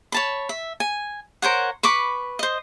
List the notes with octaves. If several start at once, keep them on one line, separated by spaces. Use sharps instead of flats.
C#5 A5 B5
E5
G#5
A#4 C5 C#5 F#5
B4 B5 C#6 D6
C5 D#5